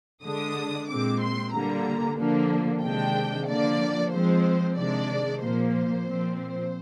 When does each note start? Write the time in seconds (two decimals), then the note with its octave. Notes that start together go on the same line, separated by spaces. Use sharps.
0.23 D3 G#3 D4 D#6
0.88 A#2 G#3 C4 D6
1.21 C6
1.53 D3 G3 A#3 A#5
2.18 D3 F3 A#3 D4
2.82 C3 D#3 G#3 D4 G5
3.47 D3 F3 A#3 D4 D5
4.12 F3 G#3 C4 C5
4.76 C3 D#3 G#3 D4 D5
5.41 A#2 F3 A#3 C5
5.73 C5
6.06 A#2 F3 C4
6.38 C5